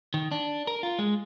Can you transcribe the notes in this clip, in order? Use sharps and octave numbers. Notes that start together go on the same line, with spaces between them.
D#3
D4
A#4
F4
G#3